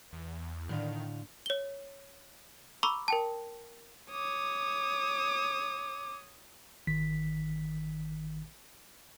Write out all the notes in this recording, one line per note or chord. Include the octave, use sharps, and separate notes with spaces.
E2
A2 D3 D#3 F5
C#5 G7
A#5 B5 C#6 D6 E6
A#4 G5 A5
C#5 D6 D#6
G#1 D#3 B6